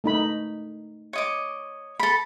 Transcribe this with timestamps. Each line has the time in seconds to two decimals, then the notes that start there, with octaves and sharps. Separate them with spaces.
0.04 A3 D#4 B5
1.13 C#5 D#5 D6
1.99 A4 B5